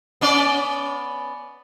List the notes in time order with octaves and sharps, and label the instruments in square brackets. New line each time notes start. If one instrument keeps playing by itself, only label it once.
[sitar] B3 C#4 D5